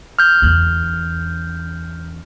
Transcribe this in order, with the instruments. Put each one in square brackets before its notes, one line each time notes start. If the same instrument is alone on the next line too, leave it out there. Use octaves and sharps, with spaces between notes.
[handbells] F6 G6
[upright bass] E2 C#4